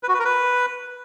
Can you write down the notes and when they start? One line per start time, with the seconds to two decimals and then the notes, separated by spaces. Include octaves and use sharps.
0.03 B4
0.09 F#4
0.14 B4
0.19 A#4
0.25 B4